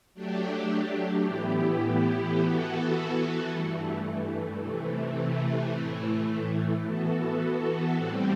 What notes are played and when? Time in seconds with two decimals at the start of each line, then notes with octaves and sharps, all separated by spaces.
0.14 F#3 A3 D4 G4
1.26 A2 E3 B3 E4 G4
2.37 E3 B3 F#4 A4
3.49 G2 E3 A3
4.61 C3 E3 A3
5.71 A2 E3 A3
6.83 E3 B3 F#4 A4
7.94 A2 G3 C4